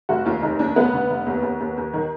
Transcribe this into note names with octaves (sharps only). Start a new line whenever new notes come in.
F1 F#4
D#2 F4
F1 D#4
D#2 D4
F1 B3
D3
F1
D#2
D#2
D#2
D#2
D#3